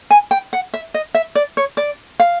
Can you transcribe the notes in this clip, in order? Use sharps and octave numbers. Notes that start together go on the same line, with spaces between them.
G#5
G5
F#5
E5
D#5
E5
D5
C#5
D5
F5